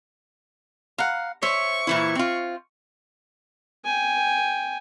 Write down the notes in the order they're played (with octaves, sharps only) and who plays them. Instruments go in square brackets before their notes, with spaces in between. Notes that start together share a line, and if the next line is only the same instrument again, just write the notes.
[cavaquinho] F5 F#5 [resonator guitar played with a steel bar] A#5
[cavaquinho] C5 E5 [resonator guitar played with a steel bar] C#5 [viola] C#6
[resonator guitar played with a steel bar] A#2 E3 E4
C4 F4
[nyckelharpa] G5 G#5